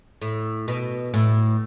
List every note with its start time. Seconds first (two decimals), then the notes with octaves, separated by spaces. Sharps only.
0.22 A2
0.68 B2
1.14 A2